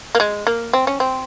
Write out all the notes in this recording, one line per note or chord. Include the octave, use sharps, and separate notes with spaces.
A#3
G#3
A#3
C4
C#4
C4